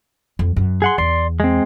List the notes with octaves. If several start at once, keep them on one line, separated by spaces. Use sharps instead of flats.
F2
F#2
G#4 F#5 C6
E2 D5 C6
G#3 C4